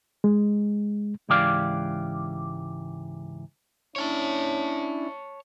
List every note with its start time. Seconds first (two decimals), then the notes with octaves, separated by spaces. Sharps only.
0.24 G#3
1.29 C#2 G#2 E3 G4 D5 F5
3.96 C#4 D4 E4 C#5 G#5 A5